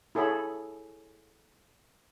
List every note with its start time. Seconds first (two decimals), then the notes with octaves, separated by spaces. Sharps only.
0.15 E4 G#4 A4 C#5 B5